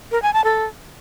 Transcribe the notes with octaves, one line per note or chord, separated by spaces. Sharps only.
A#4
G#5
A5
A4